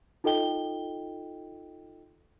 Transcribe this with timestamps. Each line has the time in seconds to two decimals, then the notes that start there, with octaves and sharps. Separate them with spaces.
0.24 D#4 F4 A4 D#5 G5 G7